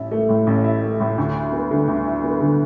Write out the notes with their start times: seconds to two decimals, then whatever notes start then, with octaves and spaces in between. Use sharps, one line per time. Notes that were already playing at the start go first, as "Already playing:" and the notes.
Already playing: A1 E4
0.11 A3
0.29 A2
0.47 A1
0.64 E4
0.83 A3
1.00 A2
1.18 D2
1.34 E4
1.52 B3
1.71 D3
1.88 D2
2.06 E4
2.24 B3
2.40 D3